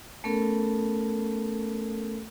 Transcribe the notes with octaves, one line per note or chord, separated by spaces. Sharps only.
A3 B3 C#4 A4 A#4